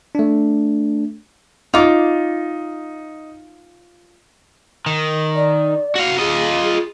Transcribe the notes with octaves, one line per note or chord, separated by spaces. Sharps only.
A3 D4
D#4 F4 D6
D#3
D5
F#4 F5
F4 G#4 D#5
G#4